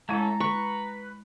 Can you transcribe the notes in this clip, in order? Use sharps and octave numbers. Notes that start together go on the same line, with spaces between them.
G#3 A3 C#4 E4 A4 A#5
B4 C#6